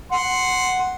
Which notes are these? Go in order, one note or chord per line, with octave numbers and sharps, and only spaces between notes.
F#5 C6